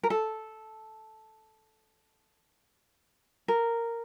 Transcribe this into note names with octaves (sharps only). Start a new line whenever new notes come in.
A#4
A4
A#4